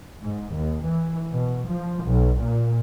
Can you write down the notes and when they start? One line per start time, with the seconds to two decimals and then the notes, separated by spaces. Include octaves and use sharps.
0.20 G#2
0.53 D#2
0.84 E3
1.33 B2
1.68 F3
2.05 B1
2.40 A#2